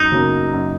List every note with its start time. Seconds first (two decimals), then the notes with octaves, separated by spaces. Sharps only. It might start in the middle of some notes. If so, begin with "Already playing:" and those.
Already playing: F#2 D#4
0.12 C#3 F#3 A#3 C#4
0.53 F#2